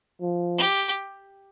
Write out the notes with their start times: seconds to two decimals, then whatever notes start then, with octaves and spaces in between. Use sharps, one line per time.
0.21 F3
0.58 G4